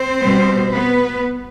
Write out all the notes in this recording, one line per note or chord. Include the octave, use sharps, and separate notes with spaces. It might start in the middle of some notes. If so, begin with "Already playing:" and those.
Already playing: C4 C5
B2 G3 B3
B3 B4